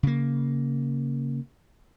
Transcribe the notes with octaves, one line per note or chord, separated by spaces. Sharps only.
C#3 A#3